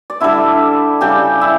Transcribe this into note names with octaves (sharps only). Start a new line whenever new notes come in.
D5
D3 G3 E4 E5
C#3 G3 G4 G5
E4 E5